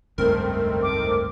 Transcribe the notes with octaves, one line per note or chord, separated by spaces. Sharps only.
F1 C#2 G2 D#3 A3 C4 A#4
D6